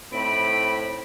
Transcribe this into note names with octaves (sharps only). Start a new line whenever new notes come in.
A2 C4 D#4 B5 D7